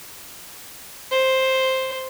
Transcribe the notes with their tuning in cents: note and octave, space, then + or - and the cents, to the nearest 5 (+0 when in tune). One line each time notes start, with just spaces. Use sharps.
C5 +5